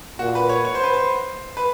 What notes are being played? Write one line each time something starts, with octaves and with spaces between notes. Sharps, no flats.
A#2 F#4
B4
C#5
C#5
C5
B4
C5
B4